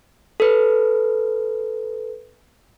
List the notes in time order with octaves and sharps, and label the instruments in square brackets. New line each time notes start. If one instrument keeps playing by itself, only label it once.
[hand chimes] A4 B4